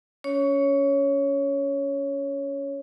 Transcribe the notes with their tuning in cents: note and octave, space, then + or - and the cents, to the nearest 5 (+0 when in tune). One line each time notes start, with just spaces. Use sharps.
C#4 +25 C#5 +0